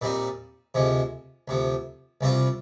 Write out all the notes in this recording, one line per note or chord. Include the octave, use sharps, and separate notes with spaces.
A#2 G3 C4 D#4
D2 C3 F3 G#3
D2 C3 F3
C2 C3 G3 C4 F4